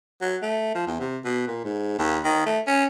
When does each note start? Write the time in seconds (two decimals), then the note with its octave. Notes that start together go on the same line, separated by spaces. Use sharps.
0.21 F#3
0.42 A3
0.75 F3
0.87 E2
1.00 C3
1.25 B2
1.47 A#2
1.64 G#2
1.98 D#2
2.24 D#3
2.46 A3
2.67 C#4